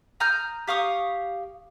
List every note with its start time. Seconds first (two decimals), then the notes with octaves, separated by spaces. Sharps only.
0.20 A#5 D#6 F6 G6
0.68 G4 F5 C#6 D#6